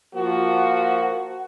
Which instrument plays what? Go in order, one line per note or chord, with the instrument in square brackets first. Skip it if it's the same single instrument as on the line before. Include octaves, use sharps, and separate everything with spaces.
[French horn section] F3 A#3 F#4 [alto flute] F#5